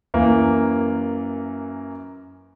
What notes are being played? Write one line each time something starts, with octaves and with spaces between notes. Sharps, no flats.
F#2 E3 A#3